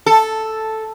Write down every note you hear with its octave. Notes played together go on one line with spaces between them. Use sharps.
A4